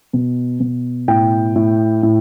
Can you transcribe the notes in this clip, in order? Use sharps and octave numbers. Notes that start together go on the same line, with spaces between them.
B2
B2
A2 G5
A2
A2